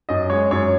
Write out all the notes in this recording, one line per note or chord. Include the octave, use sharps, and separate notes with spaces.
F#2 D#5
G#3 C#5
F#2 C#5